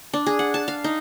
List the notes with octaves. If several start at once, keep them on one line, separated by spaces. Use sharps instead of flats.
D4
G#4
F#5
A5
F5
D#4